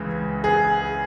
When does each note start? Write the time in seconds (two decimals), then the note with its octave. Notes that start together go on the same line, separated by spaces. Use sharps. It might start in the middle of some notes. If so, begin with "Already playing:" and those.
Already playing: C#2 C#3 E3
0.44 G#4